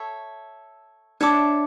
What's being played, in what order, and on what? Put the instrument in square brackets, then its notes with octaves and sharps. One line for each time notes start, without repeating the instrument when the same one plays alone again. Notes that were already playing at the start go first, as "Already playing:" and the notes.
Already playing: [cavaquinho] A4 C#5 E5
[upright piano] D4 [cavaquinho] C#5 E5 A5 D6